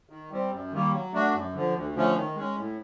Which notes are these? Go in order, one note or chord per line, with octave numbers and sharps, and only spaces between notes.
D#3
G3 C4
F#2
D#3 G3 A#3
F#3
A3 D4 F#4
F#2
D3 F3
D2
D3 F3 A3 C#4
D#3
G#3 C#4
A2